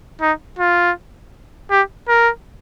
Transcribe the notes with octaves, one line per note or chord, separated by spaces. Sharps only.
D#4
F4
G4
A#4